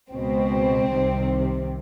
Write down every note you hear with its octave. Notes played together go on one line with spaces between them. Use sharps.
C#2 B2 G#3 C4
C2 C3 D#3